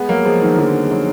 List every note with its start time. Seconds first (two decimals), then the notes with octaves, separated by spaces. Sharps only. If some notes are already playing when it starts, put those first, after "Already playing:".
Already playing: G#3 B3
0.09 F#3 A#3
0.25 F3 G#3
0.42 D#3 F#3
0.58 D3 F3
0.84 G#3
0.92 D#3 F#3